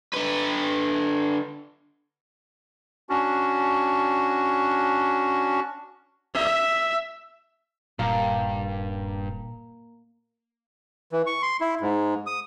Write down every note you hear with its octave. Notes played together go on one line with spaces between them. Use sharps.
D3 B4
C#4 D4 F#4
E5
D#1 G2 A#2 A#3
E3
C#6
C6
E4
G#2
D#6